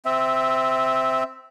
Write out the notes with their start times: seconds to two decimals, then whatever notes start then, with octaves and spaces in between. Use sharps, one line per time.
0.05 C4 E5